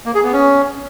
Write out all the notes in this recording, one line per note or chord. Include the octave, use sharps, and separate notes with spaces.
A#3
G#4
B3
C#4